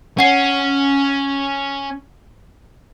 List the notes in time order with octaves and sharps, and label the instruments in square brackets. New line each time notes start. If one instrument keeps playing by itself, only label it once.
[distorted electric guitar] C#4 [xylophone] F#5 C7